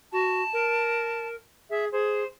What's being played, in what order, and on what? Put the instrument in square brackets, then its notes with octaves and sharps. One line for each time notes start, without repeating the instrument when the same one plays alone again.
[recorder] F#4 [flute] A5
[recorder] A#4
[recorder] G#4 [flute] E5
[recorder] G#4 [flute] C5